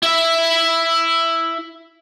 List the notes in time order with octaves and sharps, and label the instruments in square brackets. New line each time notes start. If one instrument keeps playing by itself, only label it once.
[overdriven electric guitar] E4 E5